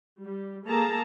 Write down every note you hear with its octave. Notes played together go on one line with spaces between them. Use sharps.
G3
A#3 G#4 A4 A5 A#5